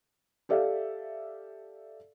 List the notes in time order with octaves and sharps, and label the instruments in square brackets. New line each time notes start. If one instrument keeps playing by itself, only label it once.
[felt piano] G4 A4 D5 E5 F5